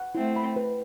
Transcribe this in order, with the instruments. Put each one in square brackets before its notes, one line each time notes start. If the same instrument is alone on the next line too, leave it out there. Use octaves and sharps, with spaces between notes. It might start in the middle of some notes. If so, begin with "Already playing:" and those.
Already playing: [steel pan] F#5
[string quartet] A3 C4 [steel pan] E4
[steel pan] B5
B4